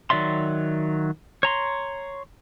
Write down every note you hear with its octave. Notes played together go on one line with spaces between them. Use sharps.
D#3 F#3 D5 E5 C6
C#5 A#5 C6